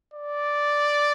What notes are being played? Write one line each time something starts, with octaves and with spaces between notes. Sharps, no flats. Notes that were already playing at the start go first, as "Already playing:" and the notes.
D5